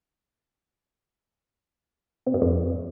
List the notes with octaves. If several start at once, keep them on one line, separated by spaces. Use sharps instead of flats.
C3
G2
F2